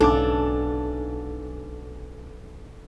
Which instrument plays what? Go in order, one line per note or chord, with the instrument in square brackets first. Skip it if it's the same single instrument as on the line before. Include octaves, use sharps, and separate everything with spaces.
[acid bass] B1 [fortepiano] G#2 C#3 D6 [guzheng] D4 [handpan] A4